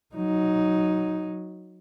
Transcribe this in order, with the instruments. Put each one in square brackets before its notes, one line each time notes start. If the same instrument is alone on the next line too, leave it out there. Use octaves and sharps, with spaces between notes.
[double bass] F#3 D#4